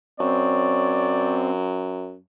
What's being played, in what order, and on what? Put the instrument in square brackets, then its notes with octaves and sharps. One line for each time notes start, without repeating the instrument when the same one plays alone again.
[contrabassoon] F#2 [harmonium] C4 [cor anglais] C#5 [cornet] D5